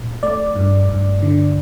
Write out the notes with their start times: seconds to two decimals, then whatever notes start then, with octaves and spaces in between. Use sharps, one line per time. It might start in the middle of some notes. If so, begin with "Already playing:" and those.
Already playing: A#2
0.23 A3 D5
0.56 G2
0.89 G2
1.22 D3